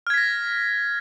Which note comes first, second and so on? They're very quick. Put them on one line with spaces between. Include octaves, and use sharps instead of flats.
F6 G#6 B6 A#6